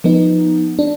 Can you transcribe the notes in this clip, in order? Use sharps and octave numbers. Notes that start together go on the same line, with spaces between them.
F3 B3 D#4
D4